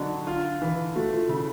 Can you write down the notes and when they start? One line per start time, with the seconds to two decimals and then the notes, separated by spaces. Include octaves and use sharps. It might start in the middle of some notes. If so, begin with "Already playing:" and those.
Already playing: D3 D#3 F#3 D4 D#4
0.27 F4
0.62 E3
0.95 A3 F#4
1.13 F4
1.29 C#3 E4